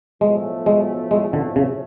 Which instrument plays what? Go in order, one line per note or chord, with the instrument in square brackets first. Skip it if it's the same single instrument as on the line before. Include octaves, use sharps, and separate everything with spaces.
[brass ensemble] B1 A2 F3 A3 [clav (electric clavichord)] G#3
[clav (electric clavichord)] G#3
G#3
D3
C#3